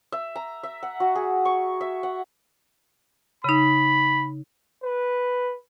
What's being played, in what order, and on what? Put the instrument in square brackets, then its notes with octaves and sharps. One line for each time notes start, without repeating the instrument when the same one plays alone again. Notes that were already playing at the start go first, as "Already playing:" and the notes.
[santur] E5
A#5
E5
F#5
F#4
G#4
C#6
E5
F#5
[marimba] C#3 D#4 [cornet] B5
[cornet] B4